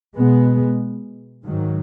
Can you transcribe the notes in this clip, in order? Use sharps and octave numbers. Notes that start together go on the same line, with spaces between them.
B2 G#3 B3
G#2 D#3 F#3